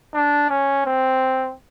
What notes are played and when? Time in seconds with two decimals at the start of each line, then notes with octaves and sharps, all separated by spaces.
0.14 D4
0.50 C#4
0.86 C4